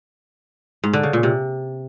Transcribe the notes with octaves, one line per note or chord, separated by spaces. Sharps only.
G#2
D3
C#3
A#2
C3